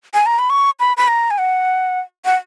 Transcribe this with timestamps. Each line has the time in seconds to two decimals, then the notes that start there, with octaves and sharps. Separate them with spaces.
0.14 G#5
0.26 A#5
0.39 B5
0.50 C#6
0.80 B5
0.97 B5
1.08 A#5
1.31 G#5
1.38 F#5
2.25 F#5